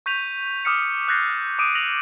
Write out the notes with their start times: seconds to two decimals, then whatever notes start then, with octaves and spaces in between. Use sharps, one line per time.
0.06 C#6 G6 B6 D#7 F7
0.65 D6 D#6 F6 B6 C#7
1.08 E6 F#6 G6 A6 A#6 C7
1.30 F6
1.59 D6 D#6 D7 D#7
1.75 E6 A#6 F7 F#7